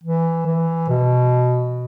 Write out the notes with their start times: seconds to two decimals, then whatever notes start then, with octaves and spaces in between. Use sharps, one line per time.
0.04 E3
0.46 E3
0.89 B2